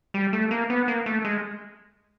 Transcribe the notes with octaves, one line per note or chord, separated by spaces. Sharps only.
G3
A3
A#3
B3
A#3
A3
G#3